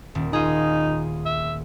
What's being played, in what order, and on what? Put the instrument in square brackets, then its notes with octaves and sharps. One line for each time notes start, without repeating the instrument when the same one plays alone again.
[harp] D#1
[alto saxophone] D#4 [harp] F4 G#4
[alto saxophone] E5